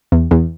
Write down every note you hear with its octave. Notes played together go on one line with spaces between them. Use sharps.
E2
E2